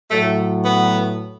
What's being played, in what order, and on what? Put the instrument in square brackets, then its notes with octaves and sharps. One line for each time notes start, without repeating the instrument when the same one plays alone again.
[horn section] A2 F#3 A3
B3